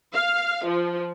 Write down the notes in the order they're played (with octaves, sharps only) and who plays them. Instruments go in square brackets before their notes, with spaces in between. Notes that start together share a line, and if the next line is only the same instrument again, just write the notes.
[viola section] F5
F3